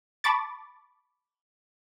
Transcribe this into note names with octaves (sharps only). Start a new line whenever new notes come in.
A5 B5 C#6 D6 A6